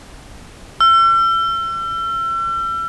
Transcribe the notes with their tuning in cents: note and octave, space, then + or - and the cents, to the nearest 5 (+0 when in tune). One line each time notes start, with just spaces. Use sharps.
E6 +40